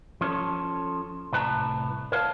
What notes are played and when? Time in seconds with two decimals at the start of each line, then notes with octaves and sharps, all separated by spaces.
0.21 F3 C#4 A4 C#5
1.32 C2 A2 B4 F#5 A5 A#5
2.12 A#4 C#5 F5 G5 A5